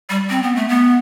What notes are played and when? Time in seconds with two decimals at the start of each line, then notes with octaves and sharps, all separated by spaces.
0.09 G3
0.29 C4
0.43 B3
0.56 A3
0.68 B3